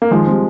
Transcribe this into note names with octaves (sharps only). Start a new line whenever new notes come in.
A#3
D#3 F3 G#3
G3 C4